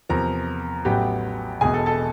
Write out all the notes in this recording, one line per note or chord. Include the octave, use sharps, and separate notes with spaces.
E2 C3 F3 A#4 A#5
A1 A2 F#3 B3 G4 G5
E1 E2 B2 G#4 G#5
A4 A5
A4 A5